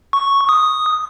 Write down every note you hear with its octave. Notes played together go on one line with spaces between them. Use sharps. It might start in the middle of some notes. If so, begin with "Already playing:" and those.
C#6
D#6